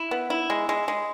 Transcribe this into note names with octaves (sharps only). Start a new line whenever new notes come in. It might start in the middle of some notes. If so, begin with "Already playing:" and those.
Already playing: E4
B3
E4
G#3
G#3
G#3